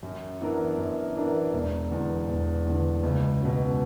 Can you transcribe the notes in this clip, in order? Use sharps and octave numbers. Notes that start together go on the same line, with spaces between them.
F#2
E3 B3 D4 A#4
F#2
E3 B3 D4 A#4
E1
E2 D3
E1
E2 D3
C#2
B2 F#3 C#4